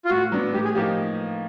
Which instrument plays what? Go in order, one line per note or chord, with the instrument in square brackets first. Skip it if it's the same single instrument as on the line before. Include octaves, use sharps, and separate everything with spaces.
[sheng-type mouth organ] F4
[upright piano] A2 [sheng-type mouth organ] F#4
[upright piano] F#3 B3 D4
[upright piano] A2 [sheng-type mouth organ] G4
[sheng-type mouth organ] G#4
[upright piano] F3 A#3 D#4 [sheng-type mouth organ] G4